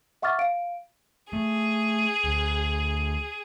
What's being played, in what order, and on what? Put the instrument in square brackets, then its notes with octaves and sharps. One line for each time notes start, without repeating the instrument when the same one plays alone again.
[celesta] E5 F#5 C#6 D6 F6 A6
F5 D7
[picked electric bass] A3 [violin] G#4
[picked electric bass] D2